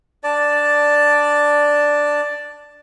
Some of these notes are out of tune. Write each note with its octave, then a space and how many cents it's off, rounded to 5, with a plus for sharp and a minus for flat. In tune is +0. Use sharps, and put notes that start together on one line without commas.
D4 -5 D5 +0 A5 +0